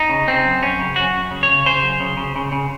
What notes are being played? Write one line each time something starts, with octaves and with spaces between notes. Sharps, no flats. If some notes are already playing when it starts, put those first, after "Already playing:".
Already playing: D#4
C#3
C#3 C4
F#2
F#2 C#4
C#3
F#2 F#4
F#2
C#3
C#5
C#3
C#3 C5
F#2
C#3
C#3
C#3
C#3